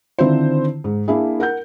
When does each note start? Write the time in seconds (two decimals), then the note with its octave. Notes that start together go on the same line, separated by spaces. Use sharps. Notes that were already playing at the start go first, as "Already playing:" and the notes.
0.19 D3 D#3 C4 E4 F4 C5
0.84 G#2
1.08 A#3 D4 E4 G#4
1.40 A#4 F#5 G6